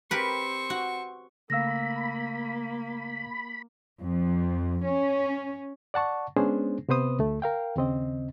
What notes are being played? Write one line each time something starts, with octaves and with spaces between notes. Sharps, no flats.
C4 G4 A#4 B4 C#6
F#4
C#3 A3 A#3 F5 B5 E6 A#6
F2
C#4
D5 F#5 A5 C#6
G#3 B3 C#4 D4 G#4 C5
C3 B3 B4 C5 D#6
D2 A3
A#4 F5 G5
D#2 C#3 C4 D#5